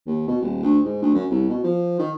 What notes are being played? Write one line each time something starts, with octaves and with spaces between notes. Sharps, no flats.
D#2
B2
D#1
D2
G#2
D2
F#2
C2
B2
F3
D#3